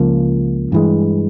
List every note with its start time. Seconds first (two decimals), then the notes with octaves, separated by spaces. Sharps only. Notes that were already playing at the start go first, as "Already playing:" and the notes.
Already playing: C#2 C#3 F3 A#3
0.72 G2 E3 G#3